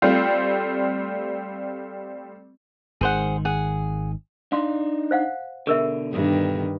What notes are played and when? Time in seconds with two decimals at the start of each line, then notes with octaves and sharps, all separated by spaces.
0.02 G3 A3 C4 F4
3.01 G#1 D#3 G#4 C5 F#5
3.45 G#4 F#5
4.52 D4 D#4 F5 C6
5.11 C5 F5 F#5
5.67 B2 D3 G#4 A#4 E5
6.13 G2 D#3